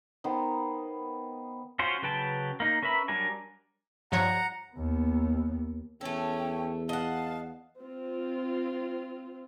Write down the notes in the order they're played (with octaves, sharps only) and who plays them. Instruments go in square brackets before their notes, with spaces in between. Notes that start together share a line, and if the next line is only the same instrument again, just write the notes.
[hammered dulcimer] D#3 B3 C5
[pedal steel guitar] C#4 F4 F#4 C5
C#3 F#3 B4 G5 A5
A#3 D#4
C#4 A#4 B4 E5 B5
F#3 G3 D4 A#4 G#5
[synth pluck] G2 F3 C#5 [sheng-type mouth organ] F#5 A#5
[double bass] D#2 B3
[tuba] E2 [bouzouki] A3 A4 [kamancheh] C#4 [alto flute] G5
[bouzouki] D#5 F#5 [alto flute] F5 [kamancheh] A5
[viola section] C4 F4